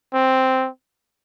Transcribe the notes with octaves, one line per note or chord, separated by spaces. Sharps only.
C4